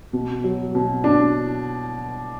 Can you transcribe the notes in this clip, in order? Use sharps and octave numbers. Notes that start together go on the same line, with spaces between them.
B2
F#3
B2
D4